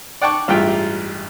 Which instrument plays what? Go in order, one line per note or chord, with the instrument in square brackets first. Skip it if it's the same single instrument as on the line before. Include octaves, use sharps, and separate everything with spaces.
[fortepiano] D5 F#5 G5 A5 C#6 D6
A1 G2 G#3 F4 E5 G5